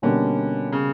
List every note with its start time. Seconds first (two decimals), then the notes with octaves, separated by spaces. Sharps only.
0.02 B2 D3 G3 A#3 C#4
0.72 C#3